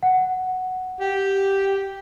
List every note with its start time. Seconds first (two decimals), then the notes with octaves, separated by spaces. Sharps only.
0.03 F#5
1.00 G4